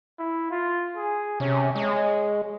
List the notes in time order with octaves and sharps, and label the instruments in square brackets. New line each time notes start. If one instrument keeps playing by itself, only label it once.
[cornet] E4
F4
G#4
[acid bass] C3 [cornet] C#4
[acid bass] G#3 [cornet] C#5